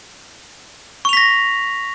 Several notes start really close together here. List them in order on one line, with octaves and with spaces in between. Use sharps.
C#6 F7 B6 A#6